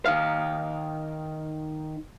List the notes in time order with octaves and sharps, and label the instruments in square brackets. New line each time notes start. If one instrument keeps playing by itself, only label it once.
[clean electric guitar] D#3 F5